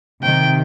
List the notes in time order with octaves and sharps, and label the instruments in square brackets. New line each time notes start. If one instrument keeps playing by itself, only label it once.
[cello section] C3 D#3 [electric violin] G5